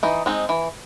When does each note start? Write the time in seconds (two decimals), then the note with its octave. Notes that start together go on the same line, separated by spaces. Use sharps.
0.03 E3 D#4
0.26 G#3 C4 D#4
0.49 E3